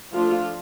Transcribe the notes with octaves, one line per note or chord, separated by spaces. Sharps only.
F3 A3 D4 F4